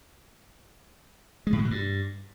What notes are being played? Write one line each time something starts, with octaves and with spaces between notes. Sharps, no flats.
G#3
A2
D3
B2
G2